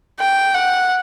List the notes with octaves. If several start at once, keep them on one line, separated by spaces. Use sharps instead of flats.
G5
F#5